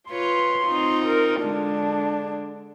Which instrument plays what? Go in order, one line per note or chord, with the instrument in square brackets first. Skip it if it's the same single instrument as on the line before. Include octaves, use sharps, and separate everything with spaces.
[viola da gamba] F4 B4 C#5 [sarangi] C6
[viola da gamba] C4 D#4 F4
[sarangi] A#4
[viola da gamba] D3 G#3 [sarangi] D4